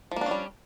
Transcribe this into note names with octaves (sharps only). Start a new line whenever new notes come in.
F3 G3 A#3 C#4 D4